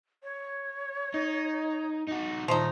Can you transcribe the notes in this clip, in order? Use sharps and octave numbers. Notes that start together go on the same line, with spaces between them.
C#5
D#4
D#4 F#4
A#2 D#3 F3 A3 D#4